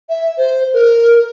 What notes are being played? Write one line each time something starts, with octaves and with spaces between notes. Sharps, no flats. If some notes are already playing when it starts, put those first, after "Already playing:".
E5
C5
A#4